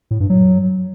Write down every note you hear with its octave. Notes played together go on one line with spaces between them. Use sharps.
A2
G2
F#3